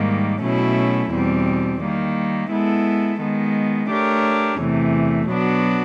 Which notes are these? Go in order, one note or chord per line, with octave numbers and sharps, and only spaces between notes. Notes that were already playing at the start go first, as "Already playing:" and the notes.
Already playing: G#2 D#3 G3 A#3
B2 F#3 A3 C#4 E4
E2 B2 G3 C4
D#3 G3 A#3
G#3 B3 E4 A4
D#3 G#3 B3
A3 D4 G4 A#4 C#5
E2 C3 E3 A3
B2 F#3 B3 D4 F#4